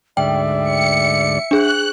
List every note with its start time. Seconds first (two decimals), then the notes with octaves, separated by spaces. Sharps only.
0.17 D2 G#2 D5 E5 G5
0.63 C#7
1.51 D4 G#4 F#6